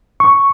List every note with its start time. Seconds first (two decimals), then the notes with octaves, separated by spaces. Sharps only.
0.20 C#6